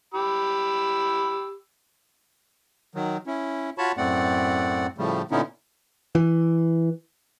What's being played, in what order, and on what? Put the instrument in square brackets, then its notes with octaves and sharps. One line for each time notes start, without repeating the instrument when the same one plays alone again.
[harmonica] G4 B5 E6
[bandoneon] D#3 F#3
C#4 E4
F4 F#4 C#5 A5 B5 C#6
F#2 A2 A3 C4 D5 F#5
A2 C#3 F3 G3 A3
A#2 D3 B3 C#4 D#4 E4
[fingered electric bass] E3